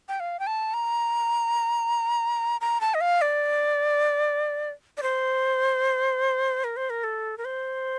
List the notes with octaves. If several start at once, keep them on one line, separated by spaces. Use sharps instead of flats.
G5
F5
G5
A5
A#5
A#5
A5
D#5
F5
D5
D5
C5
A#4
C5
A#4
A4
A#4
C5